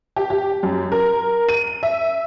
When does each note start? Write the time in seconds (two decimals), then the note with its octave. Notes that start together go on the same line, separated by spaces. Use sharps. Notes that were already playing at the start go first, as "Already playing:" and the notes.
0.16 G4
0.30 G4
0.63 F#2
0.92 A#4
1.49 D#7
1.83 E5